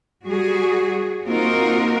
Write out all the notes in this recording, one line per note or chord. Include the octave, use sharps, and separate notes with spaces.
G3 F#4 G#4
A#3 C4 D#4 F4 F#4 A#4